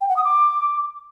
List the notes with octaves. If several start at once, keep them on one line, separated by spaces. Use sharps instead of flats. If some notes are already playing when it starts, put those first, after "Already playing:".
G5
F#5
D#6
D6